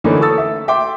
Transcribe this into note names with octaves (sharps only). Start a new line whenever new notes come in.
D3 E3 A3 A#3 C#4 D#4
A3 A4 C#6 D#6 E6 A6
E5
E5 G5 C6 D6